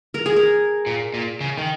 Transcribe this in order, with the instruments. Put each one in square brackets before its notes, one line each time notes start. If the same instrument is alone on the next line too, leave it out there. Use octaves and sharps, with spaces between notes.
[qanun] A#4
G#4
A#4
[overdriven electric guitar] A#2
A#2
C#3
D#3